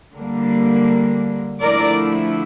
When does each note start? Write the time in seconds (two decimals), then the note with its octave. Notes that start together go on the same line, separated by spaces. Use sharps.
0.14 D3 G3 A#3
1.61 D3 F3 A3 E4 A#4 D5